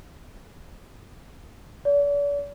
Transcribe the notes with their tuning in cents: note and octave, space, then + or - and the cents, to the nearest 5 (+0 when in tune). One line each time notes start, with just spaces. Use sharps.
D5 -45